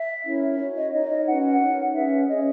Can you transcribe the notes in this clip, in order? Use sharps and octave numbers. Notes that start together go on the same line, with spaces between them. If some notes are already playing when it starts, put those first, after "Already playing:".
Already playing: E5
C#4 E4 A#4 C#5
F#4 C#5
D#5
D#4 A#4 C#5 D#5
D#5
C#4 F#4 B4 F#5
F#5
D#4 A#4 C#5
C#4 G#4 B4 E5
C#4 G#4 C#5 D#5